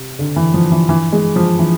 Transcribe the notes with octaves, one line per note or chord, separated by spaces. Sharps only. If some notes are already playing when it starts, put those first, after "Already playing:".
Already playing: C3
D3
E3
F3
E3
E3
G#3
F3
E3